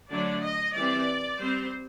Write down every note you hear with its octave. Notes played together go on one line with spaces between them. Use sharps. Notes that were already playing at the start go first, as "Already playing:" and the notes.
D3 F#3 A3 D4 D5
D#5
E3 G3 C4 D5
G3 C4 C5